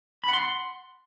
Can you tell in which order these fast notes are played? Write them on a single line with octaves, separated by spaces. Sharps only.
B5 F#5 C6